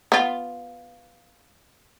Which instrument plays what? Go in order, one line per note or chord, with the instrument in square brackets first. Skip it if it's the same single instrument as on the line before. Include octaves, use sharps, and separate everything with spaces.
[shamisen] B3 F4